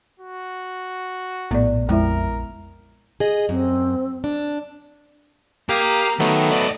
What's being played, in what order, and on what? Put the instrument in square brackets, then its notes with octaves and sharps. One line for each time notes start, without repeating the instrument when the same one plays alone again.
[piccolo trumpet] F#4
[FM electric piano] A#1 [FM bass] A2 [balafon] B3 D5
[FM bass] F2 [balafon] G#3 E4 E5 [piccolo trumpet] A#4
[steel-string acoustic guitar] G#4 D#5
[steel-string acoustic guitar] F#2 [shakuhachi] C4
[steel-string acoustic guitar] D4
[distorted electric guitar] A#3 [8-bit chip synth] G4 F5 D#6
[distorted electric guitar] D#3 [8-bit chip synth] F#3 A3 B3
[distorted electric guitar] D5 D#5